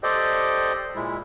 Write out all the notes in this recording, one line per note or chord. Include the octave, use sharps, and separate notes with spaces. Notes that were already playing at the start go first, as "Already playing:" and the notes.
G4 A4 C5 D5 D#5 G5
A#2 G#3 E4